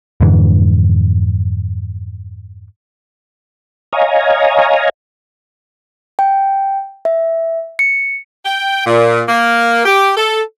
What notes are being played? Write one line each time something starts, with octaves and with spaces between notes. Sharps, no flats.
F2 G#2 D3 E3
C#5 D#5 F5 G#5 A#5
G5
E5
C#7
G5
A#2
A#3
G4
A4